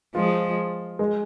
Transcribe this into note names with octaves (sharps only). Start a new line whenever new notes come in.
F3 G#3 F4
G#3